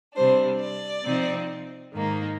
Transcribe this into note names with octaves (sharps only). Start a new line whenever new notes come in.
C3 G3 D4 C5
D5
C3 F3 C4 D#4
G#2 D#3 A#3 D#4